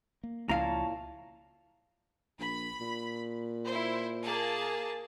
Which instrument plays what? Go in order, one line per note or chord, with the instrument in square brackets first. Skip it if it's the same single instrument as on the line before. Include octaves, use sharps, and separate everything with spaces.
[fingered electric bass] A#3
[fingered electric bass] C#2 F3 [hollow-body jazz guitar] A#2 E4 F5 [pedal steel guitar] C#5 A5 A#5
[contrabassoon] A#1 [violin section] B5
[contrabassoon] A#2
[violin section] E4 C5
A#3 G#4 A5